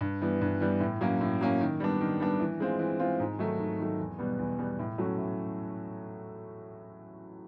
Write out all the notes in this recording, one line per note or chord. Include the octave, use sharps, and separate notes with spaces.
G2
E3 G3 B3
G2
E3 G3 B3
A2
F#3 A#3 C#4
A2
F#3 A#3 C#4
D#3
G3 B3 D4
D#3
G3 B3 D4
E3
G#3 C4 F4
E3
G#3 C4 F4
G#2
D#3 F#3 A3
G#2
D#3 F#3 A3
E2
B2 G3 B3
E2
B2 G3 B3
A2
F#3 A3 C#4 F#4
A2